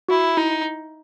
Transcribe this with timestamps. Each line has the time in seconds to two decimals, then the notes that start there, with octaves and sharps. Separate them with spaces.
0.09 E4 F#4
0.37 D#4 E4